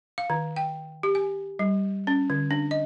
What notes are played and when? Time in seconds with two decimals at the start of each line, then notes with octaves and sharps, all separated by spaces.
0.18 F5
0.30 D#3
0.56 G5
1.03 G4
1.15 G#5
1.59 G3
2.07 C#4
2.30 D3
2.51 D4
2.71 D#5